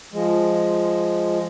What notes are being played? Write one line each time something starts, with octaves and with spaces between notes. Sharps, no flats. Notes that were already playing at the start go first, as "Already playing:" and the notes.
F3 G#3